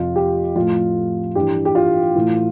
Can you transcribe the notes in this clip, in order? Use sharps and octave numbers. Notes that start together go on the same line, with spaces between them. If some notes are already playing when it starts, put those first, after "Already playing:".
Already playing: F2 C3 F3 F4
G4
A2 F3 F4
G2 E3 G4
G4
F4
A2 E3